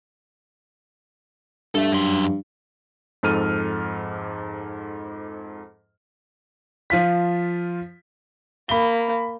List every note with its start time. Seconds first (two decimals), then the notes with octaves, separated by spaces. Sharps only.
1.75 G2 A4 E5
1.92 F#2 C6
3.23 F2 G#2 A4 F6 D#7
6.90 F3 F4 B6
8.69 A#3 B5 G7